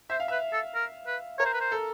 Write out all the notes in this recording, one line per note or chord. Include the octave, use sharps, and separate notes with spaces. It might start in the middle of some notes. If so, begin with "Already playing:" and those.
C5 E5
F5
B4 E5
A4
A#4
B4
A#4 C#5
C5
B4
C5
A4